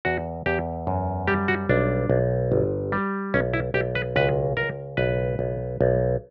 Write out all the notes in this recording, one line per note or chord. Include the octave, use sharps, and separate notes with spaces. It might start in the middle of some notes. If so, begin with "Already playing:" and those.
E2 F#4
E2 G4
F#2
G3 G4
F#4
B1 D4
B1
G1
G3
B1 C#4
E4
B1 G4
B4
C#2 B4
C#2 A#4
B1 B4
B1
B1